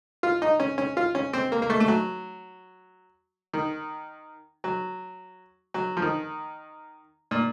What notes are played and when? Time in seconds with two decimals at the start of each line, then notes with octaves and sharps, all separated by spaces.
0.23 F4
0.42 D#4
0.60 C#4
0.78 C#4
0.97 F4
1.15 C#4
1.33 C4
1.52 A#3
1.62 A#3
1.70 A3
1.80 A3
1.88 F#3
3.53 D#3
4.64 F#3
5.74 F#3
5.97 F3
6.02 D#3
7.31 A#2